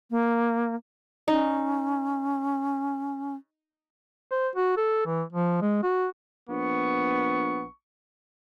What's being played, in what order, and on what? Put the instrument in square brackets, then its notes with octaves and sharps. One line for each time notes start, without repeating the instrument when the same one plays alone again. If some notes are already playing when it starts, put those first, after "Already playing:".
[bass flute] A#3
[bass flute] C#4 [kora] D#4
[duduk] C5
F#4
A4
E3
F3
G#3
F#4
[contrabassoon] A#1 [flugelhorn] B3 [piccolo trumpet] C#6